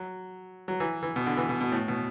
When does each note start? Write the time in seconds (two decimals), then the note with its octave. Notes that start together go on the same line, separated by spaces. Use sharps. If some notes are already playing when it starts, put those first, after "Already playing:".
Already playing: F#3
0.68 F#3
0.80 E3
1.03 E3
1.16 B2
1.26 D3
1.37 E3
1.49 B2
1.61 B2
1.72 A2
1.88 B2